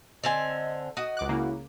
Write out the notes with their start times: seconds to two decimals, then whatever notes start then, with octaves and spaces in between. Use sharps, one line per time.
0.24 D3 C4 D#5 G#5
0.97 F#4 D#5 D#6
1.17 C#2 D6 F#6
1.29 C#3 A#3 E4